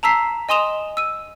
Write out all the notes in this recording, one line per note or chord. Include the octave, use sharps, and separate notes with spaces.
A5 A#5 E6 B6 C7
D#5 G#5 C6 D#6 E7 F7
E6 D#7